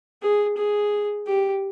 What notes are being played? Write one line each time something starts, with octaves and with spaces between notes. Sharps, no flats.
G#4
G#4
G4